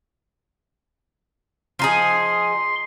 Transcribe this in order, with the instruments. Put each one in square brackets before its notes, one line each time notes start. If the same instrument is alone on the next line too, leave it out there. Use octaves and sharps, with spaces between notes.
[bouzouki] F3 D#4 G#4 [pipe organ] C6